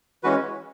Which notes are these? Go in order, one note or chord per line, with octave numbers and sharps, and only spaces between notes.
E3 G#3 C#4 F#4 B4